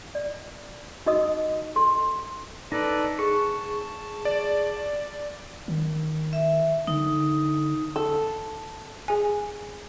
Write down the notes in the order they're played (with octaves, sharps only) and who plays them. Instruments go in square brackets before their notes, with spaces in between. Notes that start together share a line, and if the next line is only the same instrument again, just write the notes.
[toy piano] D5
D#4 F#4 A#4 D#5 D#6
A4 C6
[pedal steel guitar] D#4 [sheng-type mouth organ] A4 B4 D5
[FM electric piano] G#4 [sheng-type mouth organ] A5 [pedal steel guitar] C#6
[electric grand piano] D5
[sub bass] D#3
[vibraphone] E5
[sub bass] D3 [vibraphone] D#4
[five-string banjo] A4
[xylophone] G#4 G#5